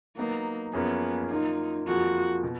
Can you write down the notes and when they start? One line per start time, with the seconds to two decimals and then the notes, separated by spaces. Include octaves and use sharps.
0.17 F#3 A#3 B3 D#4
0.73 F#2 F3 A#3 B3 C#4 G#4
1.30 F#3 A#3 D#4 F4
1.87 F2 F3 A#3 F4 F#4 G#4
2.44 B2